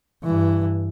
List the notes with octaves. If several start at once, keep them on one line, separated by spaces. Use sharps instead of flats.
G2 E3